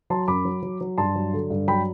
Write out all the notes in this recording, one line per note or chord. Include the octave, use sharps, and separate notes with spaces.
F#3 A5 C6
F#2 B5 D6
F#3
F#3
F#3
G2 A5 C6
F#3
D3
G2
F#3 G5 B5